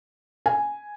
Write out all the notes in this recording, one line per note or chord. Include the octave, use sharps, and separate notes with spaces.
G#5